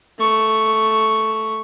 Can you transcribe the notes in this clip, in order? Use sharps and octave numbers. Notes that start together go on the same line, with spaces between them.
A3 C#6